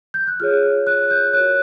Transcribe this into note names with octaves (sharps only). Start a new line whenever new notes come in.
G6
F#6
F4 G#4 C#5 F6
F#6
G6
F#4 A#4 C#5 F#6